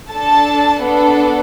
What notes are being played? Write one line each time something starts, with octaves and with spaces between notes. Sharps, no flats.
D4 A4 A5
B3 D4 A4